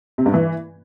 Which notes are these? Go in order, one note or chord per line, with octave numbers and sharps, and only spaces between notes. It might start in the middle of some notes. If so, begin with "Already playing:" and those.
C3
G2
E3